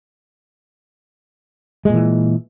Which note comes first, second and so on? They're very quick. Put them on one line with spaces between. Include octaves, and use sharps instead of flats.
G#3 A#2 E3